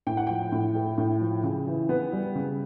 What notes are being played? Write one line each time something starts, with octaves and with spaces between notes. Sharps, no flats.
A2 G5
F#5
F3 G5
A2
A3
A2
F3
C#3
E3
B3
G3
C#3